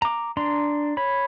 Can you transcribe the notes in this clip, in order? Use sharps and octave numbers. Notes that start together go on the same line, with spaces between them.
A#5 D6
D4 A#5 C6
C#5 B5